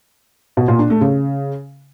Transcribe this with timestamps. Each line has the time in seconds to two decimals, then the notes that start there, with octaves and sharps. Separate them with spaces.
0.57 B2
0.68 A#2
0.79 D4
0.90 A3
1.01 C#3